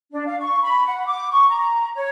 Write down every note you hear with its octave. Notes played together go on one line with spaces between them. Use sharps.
D4
F5
C#6
B5
F#5
D6
C#6
A#5
C#5